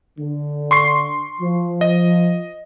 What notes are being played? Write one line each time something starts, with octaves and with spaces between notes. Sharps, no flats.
D3
C6 C#6 C7
F3
D#5